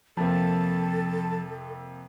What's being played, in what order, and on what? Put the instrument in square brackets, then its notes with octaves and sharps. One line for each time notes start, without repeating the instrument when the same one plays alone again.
[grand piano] F2 C3 A#3 [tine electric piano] F3 [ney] A4 [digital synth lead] A5